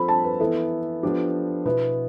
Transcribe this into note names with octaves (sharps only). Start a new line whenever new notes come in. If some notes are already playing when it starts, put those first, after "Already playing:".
Already playing: F3 C4 F4 A4 B5
A5
B4
E3 B3 E4 A4
F3 B3 D4 G4
B2 B3 E4 B4